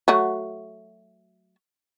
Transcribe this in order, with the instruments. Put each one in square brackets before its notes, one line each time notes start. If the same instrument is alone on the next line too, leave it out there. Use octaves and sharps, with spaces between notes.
[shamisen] F#3 A3 F#4